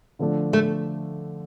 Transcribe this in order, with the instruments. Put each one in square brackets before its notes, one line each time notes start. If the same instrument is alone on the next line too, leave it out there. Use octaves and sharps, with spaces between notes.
[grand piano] D3 F3 A3 D4
[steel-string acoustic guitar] A3